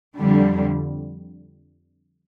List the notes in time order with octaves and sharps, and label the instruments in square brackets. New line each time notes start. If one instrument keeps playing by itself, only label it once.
[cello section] F2 D3 G3